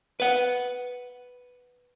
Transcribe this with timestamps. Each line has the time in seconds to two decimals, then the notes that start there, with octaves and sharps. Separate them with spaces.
0.20 B4 F#5